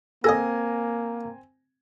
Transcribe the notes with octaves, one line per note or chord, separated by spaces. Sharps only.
A#3 C4 A4 D#5 G#5 A#6